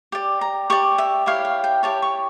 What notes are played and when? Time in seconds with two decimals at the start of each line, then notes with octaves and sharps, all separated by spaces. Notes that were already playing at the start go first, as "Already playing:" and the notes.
0.12 G4 D5
0.41 A#5
0.70 G4 D5 C#6
0.98 E5
1.26 E4 G4 C#5 F5
1.45 F5
1.64 G5
1.83 E4 G4 C#5 A5
2.02 C#6